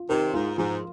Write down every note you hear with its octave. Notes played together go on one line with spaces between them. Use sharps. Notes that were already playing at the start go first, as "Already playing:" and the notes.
Already playing: F4
C3 D#3 A#4
G#2 F4
G#2 F3